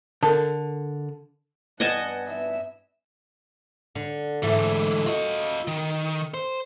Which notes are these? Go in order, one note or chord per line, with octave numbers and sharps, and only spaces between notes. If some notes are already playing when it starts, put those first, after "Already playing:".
D3 A4 A#4 A5
G2 B3 D#5 F#5 G#5 A5
E5
D3
G#2 D3 E3 A3
F4 F#4 D#5
D#3
C5